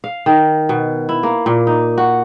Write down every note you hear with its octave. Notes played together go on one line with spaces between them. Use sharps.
F5
D#3
B2
E4
A#3
A#2
D#4
F#4